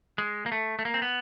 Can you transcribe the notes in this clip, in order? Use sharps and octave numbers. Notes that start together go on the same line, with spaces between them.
G#3
A#3
A3
A3
A#3
C4
B3